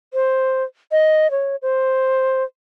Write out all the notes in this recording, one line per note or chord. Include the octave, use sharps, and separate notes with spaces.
C5
D#5
C#5
C5